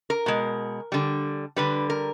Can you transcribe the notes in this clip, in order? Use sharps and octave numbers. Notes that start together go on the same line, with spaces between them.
A#4
B2 G#3
D3 G3
D3 G3 B4
A#4